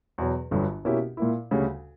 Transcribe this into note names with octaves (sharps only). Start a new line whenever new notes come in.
E2 B2 F#3
G1 G2 D3 F#3
B2 A#3 C#4 E4 G4
A#2 A#3 E4
D2 C#3 G3 C#4